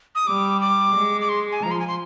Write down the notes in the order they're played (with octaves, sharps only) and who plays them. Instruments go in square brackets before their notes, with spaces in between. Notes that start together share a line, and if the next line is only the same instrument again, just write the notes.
[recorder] D#6
[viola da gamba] G3 [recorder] D6
[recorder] D6
[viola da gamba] G#3
[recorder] D6
C6
G#5
[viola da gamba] F3 [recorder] A#5
[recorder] C6
G#5
C6